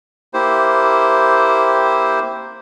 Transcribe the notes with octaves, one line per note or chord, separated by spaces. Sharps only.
A#3 E4 G4 C5